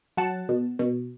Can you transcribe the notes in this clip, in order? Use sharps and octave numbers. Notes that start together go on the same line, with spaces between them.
F#3 F#5 A5
B2
B2